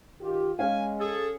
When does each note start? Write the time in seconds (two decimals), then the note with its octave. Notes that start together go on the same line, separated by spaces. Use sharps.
0.21 D#3 F4 G4
0.59 G#3 C#4 F5 G#5
1.00 G#4 A4